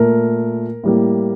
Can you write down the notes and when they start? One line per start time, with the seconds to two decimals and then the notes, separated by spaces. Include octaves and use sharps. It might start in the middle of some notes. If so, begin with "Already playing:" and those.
Already playing: A#2 A3 A#4
0.84 A2 G3 A#3